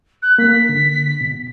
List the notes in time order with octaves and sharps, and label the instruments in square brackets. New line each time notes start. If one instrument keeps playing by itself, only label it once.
[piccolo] F#6
[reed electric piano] A#3 [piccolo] B6
[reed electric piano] D3
B2